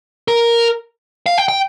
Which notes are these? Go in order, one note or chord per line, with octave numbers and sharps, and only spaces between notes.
A#4
F5
G5
G5